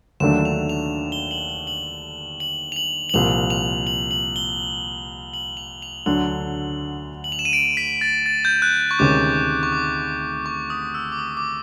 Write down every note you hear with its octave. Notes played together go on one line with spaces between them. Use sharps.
D#2 D3 F#3 A3 D4 E7
F7
F7
G7
F#7
F#7
F#7
F#7
F7
F#7
F#7
C2 A#2 F3 F7
F7
F#7
F#7
G7
F#7
F7
F7
D2 D3 F#3 F#7
F#7
F7
E7
D#7
D7
B6
A6
A6
G6
F#6
C#6
D2 C3 D#3 G#3 C#4 D6
C#6
D6
C#6
D#6
E6
D6
D#6
D6